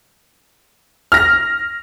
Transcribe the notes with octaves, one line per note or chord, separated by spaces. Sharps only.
F6 A#6